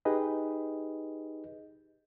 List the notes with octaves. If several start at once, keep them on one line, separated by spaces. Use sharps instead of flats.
D#4 G4 G#4 B4 D#5